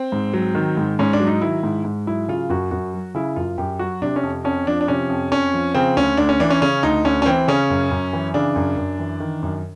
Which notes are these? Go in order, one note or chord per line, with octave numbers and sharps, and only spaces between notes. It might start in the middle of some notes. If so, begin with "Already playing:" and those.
Already playing: C4
G#2
F#3
D#3
G#2
G#2 C#4
D4
F#3
D#4
D#3 E4
G#2
G#2
F#3 E4
C#3 F4
F#2 F#4
F#2 F#4
F#3
C#3 E4
F#2 F4
F#2 G4
F#3 F#4
C3 D4
C#4
F2
F2 C#4
F3 D4
D4
C3 C#4
F2
F2 C#4
F3
C#3 C4
D2 C#4
D2 D4
C#4
E3 D4
C#4
C#3 C#4
D2 D#4
D2 C#4
C#4
E3 C4
C#3 C#4
F#2
F#2
E3
C#3 D4
F#2
F#2
E3
D#3
F#2